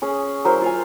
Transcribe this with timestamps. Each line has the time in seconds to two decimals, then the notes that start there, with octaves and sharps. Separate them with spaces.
0.02 C#4 G#4 D#6
0.45 F#3 E4 A#4 C5
0.62 F4 F5 G#5